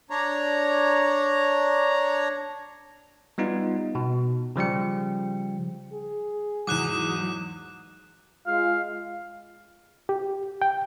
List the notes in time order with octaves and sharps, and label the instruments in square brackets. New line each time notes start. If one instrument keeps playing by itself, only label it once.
[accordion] D4 C#5 A#5
[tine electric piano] G3 B3 D#4 F4
B2
C#3 F3 G3 G5 C#7
[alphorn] G#4
[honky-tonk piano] E2 G#2 [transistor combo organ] F#3 D#6 [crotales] D6 F#6 E7
[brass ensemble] G#3 F4 [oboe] F5
[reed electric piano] G4
G5